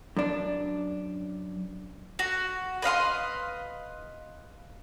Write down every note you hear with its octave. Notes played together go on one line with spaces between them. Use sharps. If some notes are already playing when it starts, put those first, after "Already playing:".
F#2 D4
F#4
B4 D#5 F5 C6